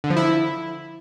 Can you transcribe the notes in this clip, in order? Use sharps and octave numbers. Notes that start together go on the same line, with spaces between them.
D3
F3
E4